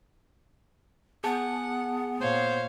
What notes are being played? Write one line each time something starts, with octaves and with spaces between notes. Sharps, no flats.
B3 G#4 F#5 G#5 A5
A#2 C5 C#5 F5